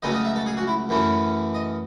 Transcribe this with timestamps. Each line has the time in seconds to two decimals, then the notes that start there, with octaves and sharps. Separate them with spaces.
0.02 C#2 C#3 F#3 A3 C#4 D#5
0.14 D#5
0.25 E5
0.36 A4
0.46 G#4
0.57 F#4
0.67 E4
0.89 F#2 E3 A3 C#4
1.54 D#5